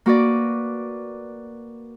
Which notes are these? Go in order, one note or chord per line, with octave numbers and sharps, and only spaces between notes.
A#3 F#4 B4 D5